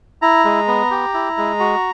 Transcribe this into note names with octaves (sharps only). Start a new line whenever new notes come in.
E4 A#5
G#3
B3
G4
E4
G#3
F#4